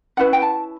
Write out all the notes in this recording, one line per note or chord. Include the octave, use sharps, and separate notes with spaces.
C#4 E4 B4 F#5
G5
A5